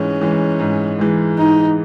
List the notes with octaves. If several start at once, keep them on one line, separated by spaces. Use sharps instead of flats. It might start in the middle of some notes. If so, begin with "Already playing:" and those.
Already playing: G#2 E3 G#3 C#4
E3 G#3
G#2
E3 G#3
G#2 D#4